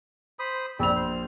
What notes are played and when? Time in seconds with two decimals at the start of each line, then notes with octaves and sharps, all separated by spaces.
0.39 C5 B5 D#6
0.79 A#1 G3 C4 F7
0.96 C5